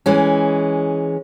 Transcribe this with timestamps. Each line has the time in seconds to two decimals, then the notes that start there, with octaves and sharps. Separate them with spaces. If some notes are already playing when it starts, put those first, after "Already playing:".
0.06 E3 G#3 C#4